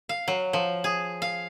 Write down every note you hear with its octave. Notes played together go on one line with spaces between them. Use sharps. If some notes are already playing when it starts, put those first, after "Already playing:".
F5
F#3
F3
G#4
F5